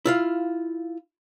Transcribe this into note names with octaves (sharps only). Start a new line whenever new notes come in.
E4 F4 F5